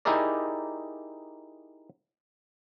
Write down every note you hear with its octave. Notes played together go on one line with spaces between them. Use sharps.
D#4 E4 G4 G#4 A#4 D5